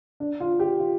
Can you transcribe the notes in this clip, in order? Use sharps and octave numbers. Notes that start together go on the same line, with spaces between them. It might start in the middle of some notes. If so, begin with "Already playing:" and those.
D4
F4
G4
F4